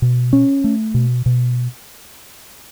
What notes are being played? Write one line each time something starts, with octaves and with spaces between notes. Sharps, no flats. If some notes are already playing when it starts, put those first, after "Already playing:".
B2
C#4
A3
B2
B2